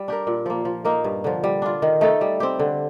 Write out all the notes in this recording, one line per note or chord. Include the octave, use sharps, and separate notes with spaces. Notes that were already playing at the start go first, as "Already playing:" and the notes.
Already playing: G3
D4 G4 A#4
A#2
F3 A#3
F3
A#3 D#4 A#4
G2
D3 F3
G3
D4 F4
D#3
A3 D#4 A4
G3
C4 G4
D3